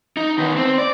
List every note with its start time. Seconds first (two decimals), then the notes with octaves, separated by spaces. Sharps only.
0.17 D#4
0.38 D#3 B3
0.56 C4
0.78 D5